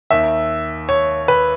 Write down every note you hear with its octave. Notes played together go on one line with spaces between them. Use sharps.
D#2 D#3 E5
C#5
B4